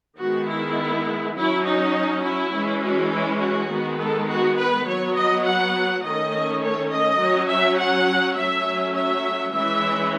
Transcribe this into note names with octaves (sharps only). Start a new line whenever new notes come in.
D#3 G#3 B3 F#4
E4
F#3 C#4 E4
D#4
E4
E3 G#3 C#4
F#4
E4
F#4
D#3 G#3 B3
A4
F#4
B4
F#3 B3 C#5
D#5
F#5
D#3 A3 C#4 D#5
C#5
D#5
F#3 C#4
E5
F#5
F#3 A3 C#4 E5
E5
E3 G#3 C#4 E5